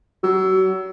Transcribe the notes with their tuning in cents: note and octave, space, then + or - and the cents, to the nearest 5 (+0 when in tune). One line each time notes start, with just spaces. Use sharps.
F#3 +35